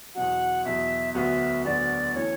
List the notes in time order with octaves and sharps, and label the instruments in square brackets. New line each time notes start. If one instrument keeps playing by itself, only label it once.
[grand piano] E2 B2 F#3 [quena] F#5
[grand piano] E2 B2 F#3 [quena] E5
[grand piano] D2 D3 F#3 B3 F#4 [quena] E5 F#5
[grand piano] D2 D3 F#3 B3 F#4 [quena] D5
[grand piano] E3 A3 C#4 [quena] C#5